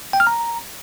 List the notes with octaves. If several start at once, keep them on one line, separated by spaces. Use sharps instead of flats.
G5
F6
A#5